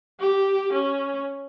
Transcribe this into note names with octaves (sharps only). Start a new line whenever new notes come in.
G4
C#4